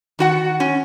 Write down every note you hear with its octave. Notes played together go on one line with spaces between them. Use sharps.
D#3 F#4 F#5
C#4